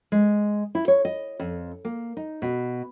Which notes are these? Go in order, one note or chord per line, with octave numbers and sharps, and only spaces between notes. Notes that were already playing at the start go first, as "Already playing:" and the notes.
G#3
E4
C#5
D#5
F2
A#3
D#4
B2